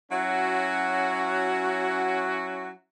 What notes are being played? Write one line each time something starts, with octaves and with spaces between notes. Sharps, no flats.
F#3 C#4 E4 F#4